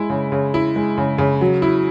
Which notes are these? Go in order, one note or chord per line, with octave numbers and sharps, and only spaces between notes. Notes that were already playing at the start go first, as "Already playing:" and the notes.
Already playing: G#3 E4
C#3
C#3
E4
G#3
C#3
C#3
F#3
E4